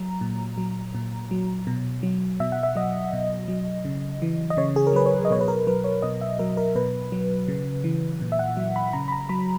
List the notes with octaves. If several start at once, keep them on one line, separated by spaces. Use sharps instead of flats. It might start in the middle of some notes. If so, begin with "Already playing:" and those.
Already playing: F#3 A#5
A#2
F#3
A#2
F#3
B2
F#3
B2 E5
F#5
E5
F#3 D#5
B2
F#3
C#3
E3
D#5
C#3 C#5
G#4
A#4
F#3 B4
C#5
D#5
B2 C#5
B4
A#4
F#3 B4
C#5
B2 D#5
E5
F#3 A#4
A#4
B2 B4
F#3
C#3
E3
A#2
E5
F#5
F#3
B5
C#3 A#5
B5
A#5
F#3 B5